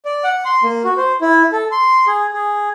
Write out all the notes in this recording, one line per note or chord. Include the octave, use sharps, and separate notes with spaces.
D5
F#5
C6
A#3
F#4
C5
E4
A4
C6
G#4
G#4